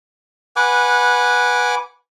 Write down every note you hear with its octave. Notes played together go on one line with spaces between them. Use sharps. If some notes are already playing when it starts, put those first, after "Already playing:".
B4 F#5 G#5 D6